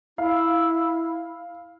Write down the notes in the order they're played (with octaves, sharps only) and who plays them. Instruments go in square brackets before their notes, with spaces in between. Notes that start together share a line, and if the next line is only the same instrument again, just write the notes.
[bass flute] E4 [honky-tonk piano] F5